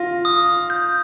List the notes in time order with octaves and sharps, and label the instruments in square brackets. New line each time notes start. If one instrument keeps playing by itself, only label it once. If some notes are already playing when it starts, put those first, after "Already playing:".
Already playing: [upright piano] F4 [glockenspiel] A#6
[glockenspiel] D#6
G6